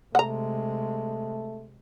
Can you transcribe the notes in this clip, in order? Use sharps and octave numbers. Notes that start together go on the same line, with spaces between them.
C3 G#3 A3 F#5 A#5